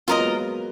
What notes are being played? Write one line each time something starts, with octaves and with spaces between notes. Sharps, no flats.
F#3 A#3 F4 A#4 D#5 A#5
G#3 B3